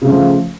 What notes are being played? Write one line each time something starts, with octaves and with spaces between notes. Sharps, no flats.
C#3 F3 A3